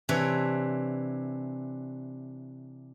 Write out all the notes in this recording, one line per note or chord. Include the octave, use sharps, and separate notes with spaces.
C3 E3 D4 C#5